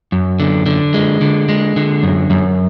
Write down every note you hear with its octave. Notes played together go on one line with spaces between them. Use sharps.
F#2
D3
D3
G#3
D3
G#3
D3
F#2
F#2